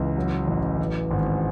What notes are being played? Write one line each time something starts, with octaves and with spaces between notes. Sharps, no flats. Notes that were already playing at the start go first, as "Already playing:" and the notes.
Already playing: C#2 E3
F#3
A1
E3
G#1